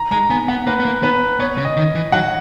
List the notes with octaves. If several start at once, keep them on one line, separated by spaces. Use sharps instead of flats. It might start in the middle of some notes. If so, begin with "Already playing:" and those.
Already playing: A#5
G#3 A#5
B3 G#5
B3 F#5
A#3 B4
B3
A#3
B3 B4
B3 C#5
C#3
D#5
D#3
E3
F#3 F#5